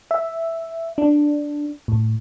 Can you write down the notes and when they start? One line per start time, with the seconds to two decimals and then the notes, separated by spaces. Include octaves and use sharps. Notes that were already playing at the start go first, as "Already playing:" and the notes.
0.11 E5
0.98 D4
1.88 A2